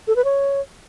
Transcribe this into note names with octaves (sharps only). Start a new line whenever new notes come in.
A4
B4
C#5